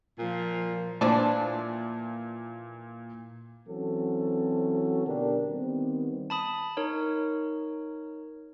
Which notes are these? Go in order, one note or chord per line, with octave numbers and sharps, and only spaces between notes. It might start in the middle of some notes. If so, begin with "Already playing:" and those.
A#2 F3
A#2 E3 F3 D4
E3 F#3 C4 C#4 F#4 A4
B2 D3 B3 D4 G4 A#4
D#3 G3 B3 C4
A5 B5 D#6
D#4 A#4 C#5